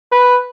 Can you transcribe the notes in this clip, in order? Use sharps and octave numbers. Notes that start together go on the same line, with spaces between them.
B4